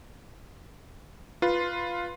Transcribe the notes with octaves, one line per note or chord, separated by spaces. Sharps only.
F4 B4 C6